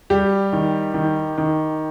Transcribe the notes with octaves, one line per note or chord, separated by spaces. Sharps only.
G3 G4
D#3
D#3
D#3